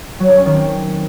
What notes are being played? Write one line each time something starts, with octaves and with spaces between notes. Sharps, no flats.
F#3
D4
C#4
D#3
C4